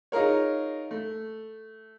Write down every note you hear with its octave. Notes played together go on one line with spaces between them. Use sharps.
D#4 F4 G#4 A#4 C#5
A3